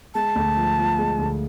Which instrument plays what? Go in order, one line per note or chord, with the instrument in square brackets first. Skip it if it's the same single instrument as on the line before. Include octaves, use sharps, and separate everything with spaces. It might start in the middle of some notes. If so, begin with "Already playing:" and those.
[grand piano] G#3 [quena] A5
[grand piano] D2
F3
F3
G#3
D2